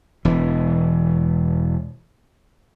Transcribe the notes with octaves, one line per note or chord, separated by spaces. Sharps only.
E1 E3